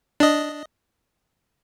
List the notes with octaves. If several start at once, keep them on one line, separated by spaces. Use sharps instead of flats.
D4 D#5